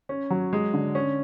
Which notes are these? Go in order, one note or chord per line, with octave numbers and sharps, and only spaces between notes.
C#4
F#3
G#3
D3
C#4